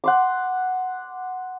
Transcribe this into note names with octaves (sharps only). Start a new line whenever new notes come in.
F#5 C6 D6